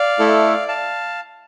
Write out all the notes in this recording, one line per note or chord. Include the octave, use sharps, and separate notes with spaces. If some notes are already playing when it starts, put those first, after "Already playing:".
Already playing: D5 F5
A3 E4 A4
F5 A5